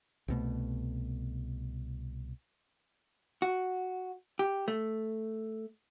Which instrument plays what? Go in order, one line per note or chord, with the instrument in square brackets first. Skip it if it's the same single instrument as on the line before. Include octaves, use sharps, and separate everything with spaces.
[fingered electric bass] C2 B2 A3
[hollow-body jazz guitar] F#4
G4
A3